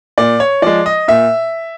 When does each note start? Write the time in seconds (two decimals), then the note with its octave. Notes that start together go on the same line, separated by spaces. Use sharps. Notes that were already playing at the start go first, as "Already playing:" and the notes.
0.18 A#2 D5
0.40 C#5
0.62 F3 G#3 D5
0.86 D#5
1.08 A#2 E5